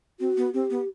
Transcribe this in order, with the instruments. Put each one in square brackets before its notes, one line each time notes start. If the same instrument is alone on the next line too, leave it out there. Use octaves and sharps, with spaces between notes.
[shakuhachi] C4 [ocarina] F#4
[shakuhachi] B3
[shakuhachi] C4 [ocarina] G4
[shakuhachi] B3